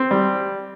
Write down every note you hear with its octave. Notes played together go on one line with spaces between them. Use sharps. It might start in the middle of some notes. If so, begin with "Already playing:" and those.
Already playing: C4
G3